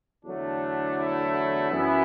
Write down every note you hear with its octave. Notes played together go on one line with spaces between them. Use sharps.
E2 D3 F#3 A3 D4
E4
F#2 E3 B3 E4